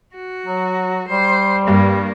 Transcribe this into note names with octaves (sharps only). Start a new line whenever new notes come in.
F#4
F#3
G3 C5
G2 A#3